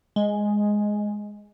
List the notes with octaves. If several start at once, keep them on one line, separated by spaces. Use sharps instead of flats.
G#3